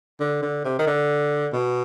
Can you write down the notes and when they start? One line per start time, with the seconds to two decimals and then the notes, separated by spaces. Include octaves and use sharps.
0.20 D3
0.42 D3
0.65 C3
0.79 D#3
0.87 D3
1.53 B2